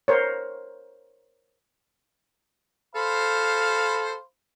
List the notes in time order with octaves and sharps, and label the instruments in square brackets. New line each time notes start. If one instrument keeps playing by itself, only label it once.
[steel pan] A#4 C5 C#5
[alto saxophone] A4 [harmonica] C5 F5 B5